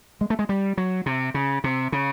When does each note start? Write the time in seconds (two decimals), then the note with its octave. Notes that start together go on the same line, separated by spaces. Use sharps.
0.21 G#3
0.30 A3
0.39 G#3
0.49 G3
0.77 F#3
1.06 C3
1.34 C#3
1.64 C3
1.92 C#3